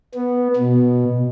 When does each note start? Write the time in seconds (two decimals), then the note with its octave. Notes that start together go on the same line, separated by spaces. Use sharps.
0.15 B3
0.56 B2